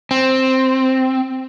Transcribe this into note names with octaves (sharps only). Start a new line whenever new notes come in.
C4